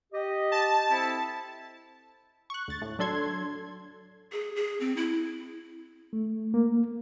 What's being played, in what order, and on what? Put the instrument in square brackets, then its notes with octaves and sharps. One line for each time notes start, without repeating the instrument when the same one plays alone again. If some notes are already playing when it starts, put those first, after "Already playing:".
[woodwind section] G4 D#5
[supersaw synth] A5
[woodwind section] C4 E4 A4
[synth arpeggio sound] C#6 F#6
D2 A6
A2
F#3 D4 A4 C6 G#6
[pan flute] G#4
G#4
C4
E4
[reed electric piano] A3
A#3